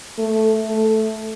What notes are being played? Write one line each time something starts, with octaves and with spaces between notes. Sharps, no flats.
A3
A3